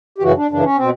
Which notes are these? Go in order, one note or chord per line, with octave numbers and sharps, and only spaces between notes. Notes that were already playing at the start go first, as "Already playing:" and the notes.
G4
F#2 C#3 E3 F#4
D4
F#2 C#3 E3 D4
C#4
B2 C4